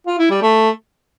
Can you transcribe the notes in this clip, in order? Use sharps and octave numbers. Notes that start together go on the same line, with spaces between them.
F4
E4
G3
A3